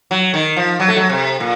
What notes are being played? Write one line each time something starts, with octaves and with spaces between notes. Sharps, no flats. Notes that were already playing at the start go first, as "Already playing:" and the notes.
F#3
D#3
F3
F#3
A3
F#3
C3
A#2